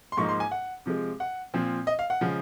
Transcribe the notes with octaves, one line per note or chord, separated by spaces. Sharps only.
C6
G#2 F3 A#3 D#4 C#6
C6
G#5
F#5
C3 F3 G#3
F#5
A#2 F3 C4
D#5
F5
F#5
C#3 F3 G#3